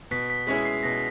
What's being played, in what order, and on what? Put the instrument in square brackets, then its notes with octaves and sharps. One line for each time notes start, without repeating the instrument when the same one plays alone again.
[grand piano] B2 [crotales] B6
[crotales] B6
[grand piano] G#3 C#4 E4 G#4 [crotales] B6
[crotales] C7
[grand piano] B2 [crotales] A#6